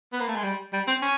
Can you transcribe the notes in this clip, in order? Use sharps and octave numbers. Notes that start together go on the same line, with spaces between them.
B3
A#3
A3
G#3
G3
G3
C4
C#4